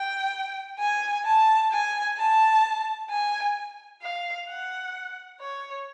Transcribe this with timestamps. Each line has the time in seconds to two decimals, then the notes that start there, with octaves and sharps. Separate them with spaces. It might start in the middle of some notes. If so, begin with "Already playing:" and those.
Already playing: G5
0.79 G#5
1.26 A5
1.72 G#5
2.18 A5
3.11 G#5
4.02 F5
4.49 F#5
5.40 C#5